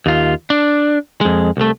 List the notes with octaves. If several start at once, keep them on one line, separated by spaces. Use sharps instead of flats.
D#2 F4
D4
F2 G#3
C2 A3